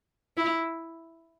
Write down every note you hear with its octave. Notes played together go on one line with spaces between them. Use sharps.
E4